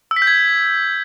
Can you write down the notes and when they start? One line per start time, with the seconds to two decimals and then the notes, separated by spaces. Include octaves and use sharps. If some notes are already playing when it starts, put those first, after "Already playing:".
0.11 E6
0.16 B6
0.22 G6
0.27 G#6